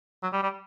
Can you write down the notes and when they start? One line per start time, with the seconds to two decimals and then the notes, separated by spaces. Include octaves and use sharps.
0.23 F#3
0.33 G3
0.43 G3